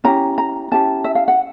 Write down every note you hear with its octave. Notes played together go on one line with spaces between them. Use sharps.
C#4 E4 G4 A#5
A#5
C#4 E4 G4 A5
E5
F5
F#5